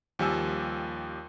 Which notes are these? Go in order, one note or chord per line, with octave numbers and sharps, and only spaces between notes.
D#2 F3 G3 G4 G#5 E6